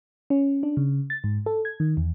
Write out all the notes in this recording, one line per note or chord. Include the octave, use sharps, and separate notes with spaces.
C#4
D4
C#3
A6
G#2
A4
G#6
D#3
E2